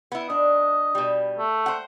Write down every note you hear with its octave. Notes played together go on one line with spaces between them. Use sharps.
B3 E4
D4 D#5
B2 G3
A3
C5 F#5